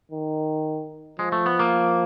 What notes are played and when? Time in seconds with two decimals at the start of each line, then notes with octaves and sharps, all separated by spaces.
0.11 D#3
1.19 F3 G#3
1.32 A3
1.46 B3
1.59 A#3